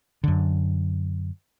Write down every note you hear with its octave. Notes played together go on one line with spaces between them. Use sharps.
F#2 D3